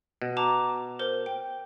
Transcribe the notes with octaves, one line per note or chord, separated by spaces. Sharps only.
B2
A5 A#5 D6
A#4 C5
G5